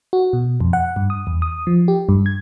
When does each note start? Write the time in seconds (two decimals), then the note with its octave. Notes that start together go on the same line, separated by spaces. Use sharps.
0.13 F#4
0.33 B2
0.61 F2
0.73 F#5
0.96 G2
1.10 D#6
1.27 E2
1.42 D#6
1.67 F3
1.88 G4
2.09 G2
2.26 G#6